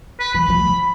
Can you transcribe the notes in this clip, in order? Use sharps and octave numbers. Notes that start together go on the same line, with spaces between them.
B4
E3 B5
F3 A3
F3